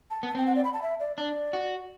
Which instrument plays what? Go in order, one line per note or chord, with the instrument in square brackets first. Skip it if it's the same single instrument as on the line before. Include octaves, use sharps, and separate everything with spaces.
[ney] A5
[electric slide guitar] B3
[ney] A5
[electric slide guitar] C4 [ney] G5
[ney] F#5
D5
B5
A5
E5
D5
[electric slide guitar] D4 [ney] D5
[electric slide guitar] F#4